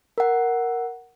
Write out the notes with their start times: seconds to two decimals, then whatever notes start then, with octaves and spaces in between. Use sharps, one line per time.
0.18 A#4 F#5